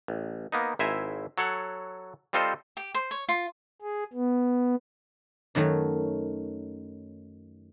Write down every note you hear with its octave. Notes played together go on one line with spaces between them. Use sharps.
A1
A#3 B3 D#4
G#1 E4 C5 E5 G#5 A#5
F#3 A4 C#5 F#5
G3 C4 F4 A4 C5 D#5
G4
C5
C#5
F4
G#4
B3
F#2 D#3 F#3 A3